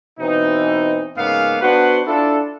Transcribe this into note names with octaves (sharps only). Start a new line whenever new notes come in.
B2 E3 C4 D#4
G#2 C#3 A#3 B3 F5
B3 D4 F#4 B4 C5 F#5
D4 E4 F4 A4